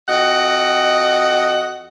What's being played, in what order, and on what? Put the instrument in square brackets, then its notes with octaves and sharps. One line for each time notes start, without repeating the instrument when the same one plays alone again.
[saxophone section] F2 F#4 D#5 F#5